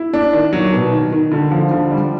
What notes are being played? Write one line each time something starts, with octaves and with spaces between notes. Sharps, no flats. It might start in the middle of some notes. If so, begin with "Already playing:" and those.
Already playing: E4
D4
D#3
F#3
B2
D#3
D#3
D3
F3
D3
G3